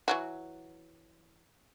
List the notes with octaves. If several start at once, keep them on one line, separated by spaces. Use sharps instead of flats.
E3 F#3 F#4